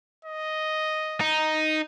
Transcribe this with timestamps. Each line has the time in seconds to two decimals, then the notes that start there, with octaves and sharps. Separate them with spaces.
0.25 D#5
1.21 D#4